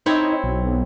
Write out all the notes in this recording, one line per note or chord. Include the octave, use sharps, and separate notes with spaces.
C4 D#4 E4 C#5
B1